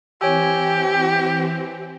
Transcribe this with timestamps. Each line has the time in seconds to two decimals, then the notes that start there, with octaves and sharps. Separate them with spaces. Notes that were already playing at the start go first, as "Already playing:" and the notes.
0.21 E3 C4 G4 C#5 G#5 E6